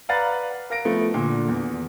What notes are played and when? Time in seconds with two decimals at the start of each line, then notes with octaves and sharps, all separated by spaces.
0.09 B4 D5 F5 F#5 A#5 A6
0.70 A#4 F5 A#6 D7
0.85 F3 A3 B3
1.14 A#2 D3
1.48 E2